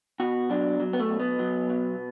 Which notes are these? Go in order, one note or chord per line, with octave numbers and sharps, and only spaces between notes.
B2 F#4
F#3 D4
F#3
B3
A3
B2
B3
F#3
B2